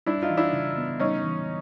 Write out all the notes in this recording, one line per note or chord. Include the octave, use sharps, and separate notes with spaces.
G3 D4 E4
D#4 F4
E3
D4 E4
C#3
B3
G3 C#4 D#4
E3